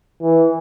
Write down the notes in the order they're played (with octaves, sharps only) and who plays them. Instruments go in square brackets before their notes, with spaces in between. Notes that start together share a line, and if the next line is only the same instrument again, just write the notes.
[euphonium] E3